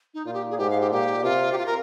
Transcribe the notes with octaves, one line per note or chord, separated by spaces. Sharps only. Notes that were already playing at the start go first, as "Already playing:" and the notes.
D#4
A#2 F4
G4
G#4
G#2 G4
F5
G4
A#2 G4
C3 F4
G4
F4
A#4